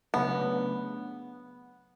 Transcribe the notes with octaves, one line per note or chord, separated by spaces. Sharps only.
C#3 F#3 A3 B3 D4